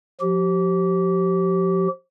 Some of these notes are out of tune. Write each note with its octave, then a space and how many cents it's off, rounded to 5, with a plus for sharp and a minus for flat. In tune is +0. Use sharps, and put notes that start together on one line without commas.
F3 +25 G4 -30